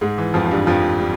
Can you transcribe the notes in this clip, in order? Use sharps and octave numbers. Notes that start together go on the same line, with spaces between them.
G#2 G#3
E3
F2 F3
F3
G2 G3
F2 F3
G3